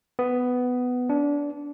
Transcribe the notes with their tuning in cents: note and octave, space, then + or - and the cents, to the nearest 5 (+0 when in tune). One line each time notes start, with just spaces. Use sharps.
B3 +10
D4 -20